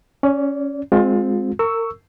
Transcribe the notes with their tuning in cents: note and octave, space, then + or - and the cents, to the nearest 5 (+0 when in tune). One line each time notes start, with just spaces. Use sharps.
C#4 +0 D5 -30
G#3 +0 C4 +0 F4 +30
A#4 -30 C#6 +10 E6 +0